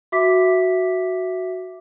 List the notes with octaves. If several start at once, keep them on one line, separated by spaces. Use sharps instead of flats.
F#4 E5 D6 B6